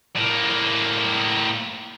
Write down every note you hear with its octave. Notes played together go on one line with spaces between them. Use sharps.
A2 A#3